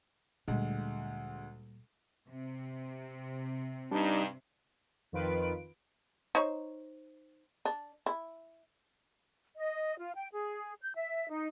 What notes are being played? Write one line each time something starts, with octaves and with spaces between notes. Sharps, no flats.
D2 A#2 G3 G#3
C3
G2 G3 D4 D#4
F2 D#3 F4 B4 D7
D#4 C5 C#5
D4
E4
D#5
F4
G5
G#4
G6
E5
D#4